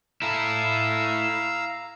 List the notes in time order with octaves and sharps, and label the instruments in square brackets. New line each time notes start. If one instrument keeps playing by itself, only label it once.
[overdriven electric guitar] E4 A4 [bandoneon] F5 A#5 E6